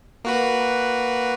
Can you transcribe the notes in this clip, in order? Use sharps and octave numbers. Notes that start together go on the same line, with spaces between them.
A#3 F#4 B4